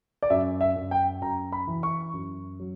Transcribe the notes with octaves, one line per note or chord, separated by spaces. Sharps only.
D5
F#2 E5
E5
F#2
G5
F#2 A#5
B5
E3
C#6
F#2
F#3